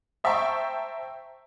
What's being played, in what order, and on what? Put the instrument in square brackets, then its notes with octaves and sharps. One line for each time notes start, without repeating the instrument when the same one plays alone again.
[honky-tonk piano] C5 E5 G5 A5 A#5 C#6